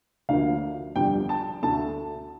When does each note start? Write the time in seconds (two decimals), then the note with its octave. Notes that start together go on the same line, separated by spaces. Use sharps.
0.29 D2 D3 F3 A#3 F5
0.95 G1 F2 D3 G3 G5
1.29 A5
1.63 D2 D3 A3 A5